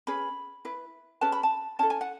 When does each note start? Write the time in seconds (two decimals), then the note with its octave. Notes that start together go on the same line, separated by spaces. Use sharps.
0.07 C#4 G#4 B4 B5
0.65 E4 B4
1.21 C#4 G#4 B4 A5
1.32 B5
1.43 A5
1.79 C#4 E4 A4 A5
1.90 G#5
2.01 F#5